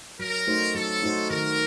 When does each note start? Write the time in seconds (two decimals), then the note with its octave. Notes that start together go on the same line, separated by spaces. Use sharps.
0.19 F#3 A#4
0.47 A3 D#4 F#4 C5
0.75 F#3 A4
1.02 A3 D#4 F#4 C5
1.30 D#3 A#4